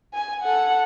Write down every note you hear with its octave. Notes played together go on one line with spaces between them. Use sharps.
G#5
A4 F#5